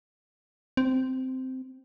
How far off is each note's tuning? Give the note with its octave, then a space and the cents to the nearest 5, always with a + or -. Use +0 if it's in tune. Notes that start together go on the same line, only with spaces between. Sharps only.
C4 -10